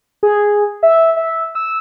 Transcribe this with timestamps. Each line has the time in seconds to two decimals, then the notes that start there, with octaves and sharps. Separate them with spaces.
0.23 G#4
0.83 E5
1.17 E5
1.55 E6